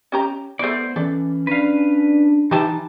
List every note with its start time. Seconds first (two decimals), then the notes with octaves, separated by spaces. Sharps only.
0.12 C#4 G4 A#5
0.59 A3 B3 E4 C5 D5
0.96 E3 C#4 A4 D5
1.47 D4 B4 F5
2.51 E3 D#4 E4 G4 B4 A5